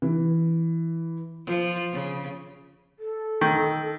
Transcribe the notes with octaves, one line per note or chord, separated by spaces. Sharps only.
E3
F3
C#3
A4
D#3